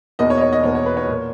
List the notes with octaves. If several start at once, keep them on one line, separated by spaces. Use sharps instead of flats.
E2 B2 A#3 D#5
C#5
D#5
C#5
D#5
E2 B2 A#3 C#5
C#5
B4
C#5
A#2 A#3